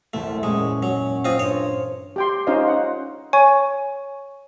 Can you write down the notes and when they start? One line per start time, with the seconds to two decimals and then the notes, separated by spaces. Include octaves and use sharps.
0.13 E1 C2 F#2 A3
0.43 A#2 G#3 C#4 C#6
0.83 F#3
1.25 C4 F4 D#5 F6
1.39 G2 G#4 C5 C#5
2.16 G4 G5 C6
2.47 C#4 D#4 F4 C5 D#5 F5
2.67 F#5
3.33 C#5 G#5 C#6